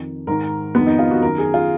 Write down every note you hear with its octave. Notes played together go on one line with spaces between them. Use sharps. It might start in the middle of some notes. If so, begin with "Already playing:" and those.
Already playing: F2 D#3
G#2 D#3 A#4
F2 D#3 B3
D#4
F4
F#4
F#2 D#3 A#4
G#4
F4